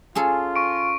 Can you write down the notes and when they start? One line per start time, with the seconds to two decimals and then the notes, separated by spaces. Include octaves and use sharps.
0.15 C#4 F4 G#4 A4
0.56 C#6 D7